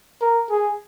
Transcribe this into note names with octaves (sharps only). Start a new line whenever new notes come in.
A#4
G#4